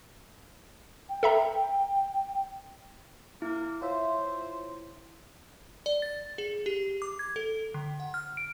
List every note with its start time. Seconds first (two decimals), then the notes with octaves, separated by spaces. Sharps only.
1.09 G5
1.23 A4 E5 A#5
3.42 A#3 E4
3.82 F4 C5 C#5 E5
5.86 D5
6.02 A6
6.38 G#4
6.66 G4
7.02 D6
7.19 G#6
7.36 A4
7.74 D3
8.00 F#5
8.14 F6
8.37 D7